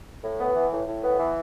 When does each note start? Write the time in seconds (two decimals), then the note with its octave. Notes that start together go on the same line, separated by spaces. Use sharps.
0.24 A2
0.40 B3
0.56 E3
0.71 A2
0.88 A2
1.03 B3
1.19 E3